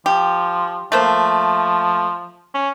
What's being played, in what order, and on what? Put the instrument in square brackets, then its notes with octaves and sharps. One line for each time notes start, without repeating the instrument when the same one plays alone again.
[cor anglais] F3 [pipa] G4
[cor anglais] F3 [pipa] A3 A#3 C5
[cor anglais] C#4